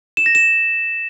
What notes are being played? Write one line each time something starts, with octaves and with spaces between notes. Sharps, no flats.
E7
A#6
E7